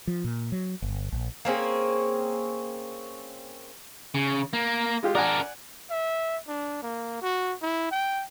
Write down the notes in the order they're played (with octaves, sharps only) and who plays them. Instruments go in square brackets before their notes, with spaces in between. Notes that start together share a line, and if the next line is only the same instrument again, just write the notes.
[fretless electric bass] F3
A#2
F#3
G1
A#1
[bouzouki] A#3 C4 C#4 G#4
[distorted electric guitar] C#3
A#3
[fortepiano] G#3 F4 G4
[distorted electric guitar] D4 A#4 [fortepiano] D5 F#5 G#5
[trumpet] E5
D4
A#3
F#4
E4
G5